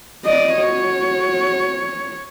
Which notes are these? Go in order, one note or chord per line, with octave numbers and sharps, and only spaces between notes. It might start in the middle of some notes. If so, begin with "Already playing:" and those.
D5 D#5
F#4 C#5